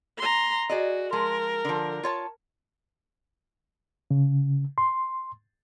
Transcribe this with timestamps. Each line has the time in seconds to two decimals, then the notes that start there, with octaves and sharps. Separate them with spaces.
0.18 A#5 C6
0.70 F#4 G#4 D5 D#5
1.13 F3 G#3 A#4
1.65 D3 F3
2.03 F4 C#5 A5
4.11 C#3
4.78 C6